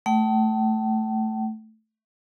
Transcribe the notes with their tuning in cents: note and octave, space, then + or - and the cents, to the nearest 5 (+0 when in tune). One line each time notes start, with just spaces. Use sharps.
A3 +0 G5 -45